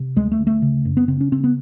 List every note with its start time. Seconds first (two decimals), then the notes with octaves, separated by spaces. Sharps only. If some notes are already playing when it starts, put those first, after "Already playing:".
Already playing: C3
0.16 D2 G#3
0.32 A3
0.39 D2
0.47 A3
0.62 C#3
0.85 F#2
0.97 B3
1.08 C#3 C4
1.21 C#4
1.32 C#3 C4
1.44 B3